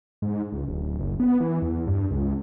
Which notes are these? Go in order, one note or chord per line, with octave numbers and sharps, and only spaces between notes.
G#2
C#2
D1
F#1
B3
E3
E2
G2
C#2